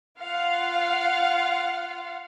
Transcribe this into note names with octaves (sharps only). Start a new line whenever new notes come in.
F4 F5 F#5